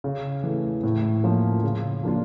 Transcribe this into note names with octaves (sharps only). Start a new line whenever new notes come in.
C#3
E3 A3
A2
F3 A#3 C#4
C#3
F3 A#3 D4 F4